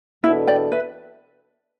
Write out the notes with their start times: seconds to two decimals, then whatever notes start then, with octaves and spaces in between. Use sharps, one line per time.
0.24 E2 B2 B3 D4 E4 A4
0.47 D5 G5
0.72 B4 E5